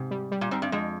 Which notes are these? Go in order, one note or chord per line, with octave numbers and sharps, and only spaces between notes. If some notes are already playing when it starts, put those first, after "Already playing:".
Already playing: G#2 C3
G3
G3
A#2
G#2 C4
G2
F2 G#3